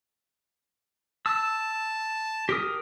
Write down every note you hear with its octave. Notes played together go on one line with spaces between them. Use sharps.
A5 E6
G4 A#4 D#6